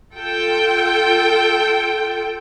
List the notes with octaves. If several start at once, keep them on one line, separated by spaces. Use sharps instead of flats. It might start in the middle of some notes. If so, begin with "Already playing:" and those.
F4 A4 G5